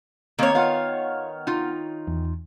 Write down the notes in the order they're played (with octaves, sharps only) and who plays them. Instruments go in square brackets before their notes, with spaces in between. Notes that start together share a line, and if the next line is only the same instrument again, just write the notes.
[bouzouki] D#3 C#5 [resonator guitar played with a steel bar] A#3 C4 A#4
[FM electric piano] B3 F#5 F6 [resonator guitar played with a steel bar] F4 F5
[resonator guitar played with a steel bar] D#4 F4
[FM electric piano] E2